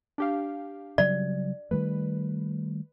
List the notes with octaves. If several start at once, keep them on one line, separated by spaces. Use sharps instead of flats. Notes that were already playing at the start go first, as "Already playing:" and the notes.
D4 G4 F5
C#3 F#3 G3 D5
D#3 G3 A3 B4